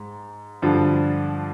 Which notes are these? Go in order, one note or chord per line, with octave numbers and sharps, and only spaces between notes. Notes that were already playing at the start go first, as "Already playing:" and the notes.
Already playing: G#2
G2 D3 F3